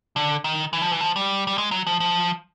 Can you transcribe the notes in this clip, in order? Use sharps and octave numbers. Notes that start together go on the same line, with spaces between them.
D3
D#3
E3
F3
E3
F3
G3
G3
G#3
F#3
F3
F3